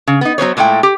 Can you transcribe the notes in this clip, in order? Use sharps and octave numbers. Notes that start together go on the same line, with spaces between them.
C#3
B3 D#4
F#3 B3 C5 C#5
A#2 G#3 A3 E4 G5
G4